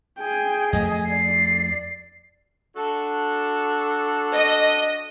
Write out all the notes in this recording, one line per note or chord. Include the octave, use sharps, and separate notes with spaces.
G#4 G5 G#5
F2 A3 D#5 G#5
D5 C7
D4 F#4 A4
D#5